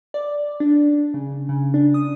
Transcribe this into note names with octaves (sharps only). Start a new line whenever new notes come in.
D5
D4
C#3
C#3
D4
D#6